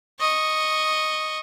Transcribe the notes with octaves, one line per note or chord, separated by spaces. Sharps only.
D#5 C#6